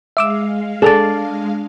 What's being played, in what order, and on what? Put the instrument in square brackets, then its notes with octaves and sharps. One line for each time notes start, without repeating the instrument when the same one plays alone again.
[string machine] G#3 F5 [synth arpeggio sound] E5 D6 E6
[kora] D4 D5 [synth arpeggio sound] G#4 A4